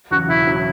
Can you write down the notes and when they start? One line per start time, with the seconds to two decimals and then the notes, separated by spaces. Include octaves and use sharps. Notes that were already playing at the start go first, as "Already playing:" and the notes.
0.11 E2 C#3 F#3 F#4
0.29 E1 E4
0.47 C#3 F#3